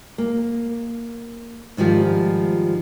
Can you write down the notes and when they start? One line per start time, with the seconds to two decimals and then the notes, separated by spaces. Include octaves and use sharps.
0.18 A#3
1.77 G#2 D#3 F3 G3 F4